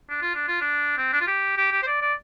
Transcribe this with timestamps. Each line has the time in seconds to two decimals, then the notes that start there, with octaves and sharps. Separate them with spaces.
0.09 D4
0.22 F4
0.35 D4
0.48 F4
0.61 D4
0.97 C4
1.13 D4
1.21 F4
1.27 G4
1.57 G4
1.72 G4
1.82 C5
1.87 D5
2.02 D5